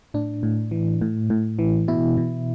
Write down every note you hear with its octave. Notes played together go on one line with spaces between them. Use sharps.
A2 D4
A2
E3
A2
A2
E3
B2 E4
B2